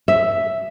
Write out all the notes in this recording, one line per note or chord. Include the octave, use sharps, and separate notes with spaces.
E5